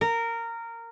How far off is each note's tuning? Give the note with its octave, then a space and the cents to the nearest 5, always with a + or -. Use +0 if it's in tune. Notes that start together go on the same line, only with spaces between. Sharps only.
A#4 -15